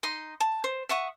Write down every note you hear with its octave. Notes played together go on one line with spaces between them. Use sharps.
D#4 D#5 C6
A5
C5
E5 F#5 C#6 D#6